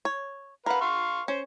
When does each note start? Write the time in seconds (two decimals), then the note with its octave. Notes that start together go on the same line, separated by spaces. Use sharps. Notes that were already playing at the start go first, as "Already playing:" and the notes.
0.05 C#5
0.66 A#4 B4 F5 F#5 B5
0.81 F5 C6 C#6
1.28 C#4 C5